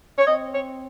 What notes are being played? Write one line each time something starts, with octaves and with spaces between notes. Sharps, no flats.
C#5
C4 D#5
C#5